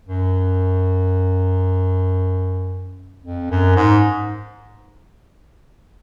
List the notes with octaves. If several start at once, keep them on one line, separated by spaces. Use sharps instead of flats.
F#2
F2
F#2
G#2